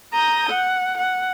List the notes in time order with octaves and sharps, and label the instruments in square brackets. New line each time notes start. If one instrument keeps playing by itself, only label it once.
[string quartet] A#5 D#6 G6
F#5
F#5